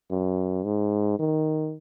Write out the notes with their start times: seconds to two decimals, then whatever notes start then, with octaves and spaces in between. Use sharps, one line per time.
0.11 F#2
0.65 G#2
1.19 D#3